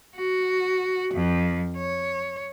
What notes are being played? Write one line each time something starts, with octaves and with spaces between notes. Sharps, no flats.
F#4
F2
C#5